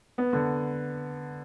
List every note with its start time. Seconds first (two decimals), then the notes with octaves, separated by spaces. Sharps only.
0.18 B3
0.33 D3